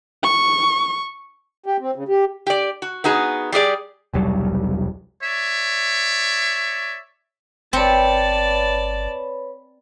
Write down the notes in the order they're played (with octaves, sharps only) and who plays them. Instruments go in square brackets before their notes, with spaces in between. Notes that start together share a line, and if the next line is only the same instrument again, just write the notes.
[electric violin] C#6
[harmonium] G4
C4
C#3
G4
[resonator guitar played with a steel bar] G4 D5
F#4
B3 D#4 F#4 G#4
G3 G4 G#4 D5
[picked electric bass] E1 C2 F#3 G3
[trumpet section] C#5 D5 E5
[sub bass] G1 [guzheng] C4 [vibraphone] B4 C#5 B5 [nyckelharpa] D5 A5